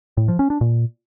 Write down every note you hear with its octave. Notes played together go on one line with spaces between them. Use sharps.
A2
F3
C#4
D4
A#2